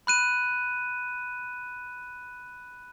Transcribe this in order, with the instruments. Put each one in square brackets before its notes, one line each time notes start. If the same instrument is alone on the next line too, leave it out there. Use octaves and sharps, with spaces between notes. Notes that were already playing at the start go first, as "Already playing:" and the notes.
[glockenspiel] B5 F#6 D#7